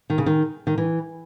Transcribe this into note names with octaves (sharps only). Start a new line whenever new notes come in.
D#3
C#3
D#3
D#3
E3